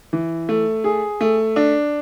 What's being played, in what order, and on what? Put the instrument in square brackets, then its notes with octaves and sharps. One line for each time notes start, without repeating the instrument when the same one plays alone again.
[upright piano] E3
A3
G#4
A3
D4